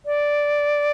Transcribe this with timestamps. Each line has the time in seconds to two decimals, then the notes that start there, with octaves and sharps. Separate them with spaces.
0.06 D5